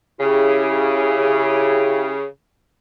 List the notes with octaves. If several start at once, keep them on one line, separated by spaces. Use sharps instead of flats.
C#3 E4 G4 G#4